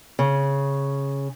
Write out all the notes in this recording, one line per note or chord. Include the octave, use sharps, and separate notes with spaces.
C#3